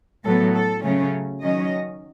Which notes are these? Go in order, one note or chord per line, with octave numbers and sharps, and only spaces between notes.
A2 F#3 B3 A4
A4
C#3 F#3 A3 C#4
D#3 F#3 C#4 D#5